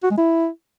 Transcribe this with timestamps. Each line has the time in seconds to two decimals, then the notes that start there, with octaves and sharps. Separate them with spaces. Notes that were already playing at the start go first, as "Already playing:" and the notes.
0.03 F#4
0.10 G#3
0.18 E4